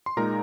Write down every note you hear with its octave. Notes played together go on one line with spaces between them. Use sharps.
C6
A#2 G#3 D#4 A#4 A#5